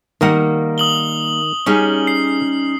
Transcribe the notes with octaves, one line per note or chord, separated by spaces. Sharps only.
D#3 G3 A#3 F#5 A#5
D#6 F#7 G7
G3 C#4 D#4 G#4 C#5
C7